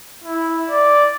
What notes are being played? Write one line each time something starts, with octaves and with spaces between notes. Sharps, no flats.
E4
D5